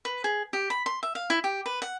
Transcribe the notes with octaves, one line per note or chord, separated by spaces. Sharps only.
B4
G#4
G4
B5
C6
E5
F5
E4
G4
B4
F#5